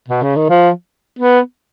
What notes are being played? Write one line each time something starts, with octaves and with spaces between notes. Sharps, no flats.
B2
C#3
D#3
F3
B3